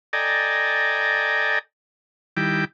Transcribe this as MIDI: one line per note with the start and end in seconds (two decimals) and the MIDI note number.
0.13 1.59 69
0.13 1.59 74
0.13 1.59 75
0.13 1.59 79
0.13 1.59 80
0.13 1.59 82
2.37 2.65 51
2.37 2.65 55
2.37 2.65 64
2.37 2.65 79
2.37 2.65 86